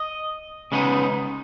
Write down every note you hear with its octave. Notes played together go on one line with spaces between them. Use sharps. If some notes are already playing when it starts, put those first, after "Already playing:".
Already playing: D#5
C#3 G#3 B3 D#4